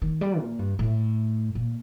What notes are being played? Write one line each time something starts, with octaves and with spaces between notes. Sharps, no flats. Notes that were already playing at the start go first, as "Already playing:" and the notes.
D#3
G3
A#2
G2
A2
A#2